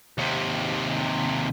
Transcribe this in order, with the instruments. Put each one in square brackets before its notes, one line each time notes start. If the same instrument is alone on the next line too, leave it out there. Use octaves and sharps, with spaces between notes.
[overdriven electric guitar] D#2 C3